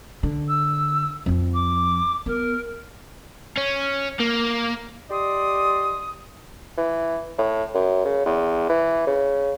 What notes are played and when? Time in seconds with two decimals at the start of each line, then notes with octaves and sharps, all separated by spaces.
0.23 D3
0.47 E6
1.26 F2 F3
1.53 D6
2.26 B3 A#4
3.57 C#4
4.20 A#3
5.10 G4 D5 D#5 C6 D#6
6.78 E3
7.38 A2
7.74 F#2
8.05 C#3
8.26 E2
8.69 E3
9.07 C#3